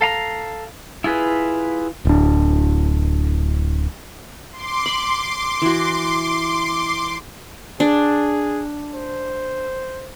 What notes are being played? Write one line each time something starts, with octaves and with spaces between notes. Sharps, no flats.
A4 F5 A#5
E4 F4 G#4 B4
D1 D4
C6 D6
B5
E3 F#4
D4 G#4
C5